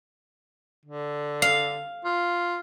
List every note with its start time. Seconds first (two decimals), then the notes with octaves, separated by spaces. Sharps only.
0.85 D3
1.42 F5
2.04 F4